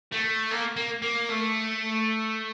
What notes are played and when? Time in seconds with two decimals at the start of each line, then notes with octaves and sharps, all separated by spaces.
0.12 A3
0.51 A#3
0.77 A#3
1.02 A#3
1.29 A3